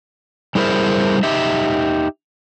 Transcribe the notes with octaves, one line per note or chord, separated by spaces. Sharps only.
G3 E4 G#4 A#4 C5 E5
D#4 G4 E5